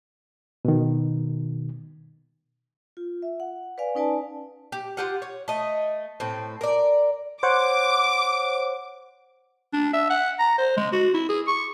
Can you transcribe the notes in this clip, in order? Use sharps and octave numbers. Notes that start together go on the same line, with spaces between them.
B2 D#3
F4
E5
F#5
B4 D5 F5 G#5
C#4 D#4 B4 D5 G#5 A5
G4
F4 G4 F#5
C#5
A3 D#5
A2 C4
A#4 D5
C5 C#5 F#5 D6
D4
E5
F#5
A#5
C5
G#3
F#4
E4
G#4
C#6